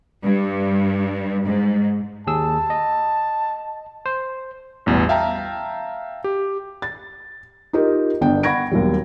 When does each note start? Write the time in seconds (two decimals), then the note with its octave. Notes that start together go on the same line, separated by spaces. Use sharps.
0.23 G2
1.46 G#2
2.27 D#2 G#4 A5 E6
2.70 D#5
4.06 C5
4.86 A1 E2 B2 G3
5.09 E5 F5 G5 A5 A#5
6.24 G4
6.82 A6
7.73 D#4 F4 G4 A#4 D#5
8.21 G1 B3 D4 G5
8.43 F#5 B5 C#6 G#6 A#6 D7
8.71 D#2 B2 F#3 G3